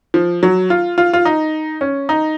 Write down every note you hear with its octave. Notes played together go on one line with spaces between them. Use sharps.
F3
F#3
F4
F4
F4
D#4
C#4
D#4